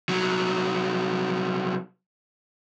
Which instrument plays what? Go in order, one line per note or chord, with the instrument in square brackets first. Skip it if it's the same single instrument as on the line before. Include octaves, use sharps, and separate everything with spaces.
[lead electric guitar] C2 F#3